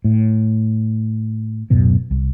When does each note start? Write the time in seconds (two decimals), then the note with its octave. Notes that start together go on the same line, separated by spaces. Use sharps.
0.04 A2
1.70 D1 F#2 B2 F#3
2.11 C2